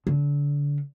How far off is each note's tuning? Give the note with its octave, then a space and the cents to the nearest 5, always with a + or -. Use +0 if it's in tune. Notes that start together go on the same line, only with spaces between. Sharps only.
D3 -30